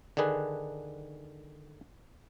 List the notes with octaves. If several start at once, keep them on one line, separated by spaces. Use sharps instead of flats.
D3 D#3 D4 G#4 B4